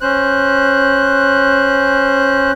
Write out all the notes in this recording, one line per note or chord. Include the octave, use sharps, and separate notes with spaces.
C#4 C5 F#6